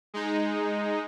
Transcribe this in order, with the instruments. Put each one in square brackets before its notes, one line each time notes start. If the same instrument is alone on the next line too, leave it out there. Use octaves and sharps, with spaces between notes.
[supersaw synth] G#3 D#4